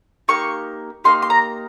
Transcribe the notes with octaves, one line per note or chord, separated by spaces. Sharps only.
A#3 D#4 G4 C#6
A#3 D#4 G4 C6
C6
A#5